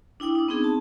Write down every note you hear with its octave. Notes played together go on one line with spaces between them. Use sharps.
D4 E4 G5 D#6 E6
D4 D6
B3 C4 D#4 G#4
A5